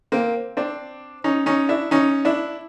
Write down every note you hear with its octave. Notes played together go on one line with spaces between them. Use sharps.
A#3 C4
C4 D4
C#4 D#4
C#4 D#4
D4 E4
C#4 D#4
D4 E4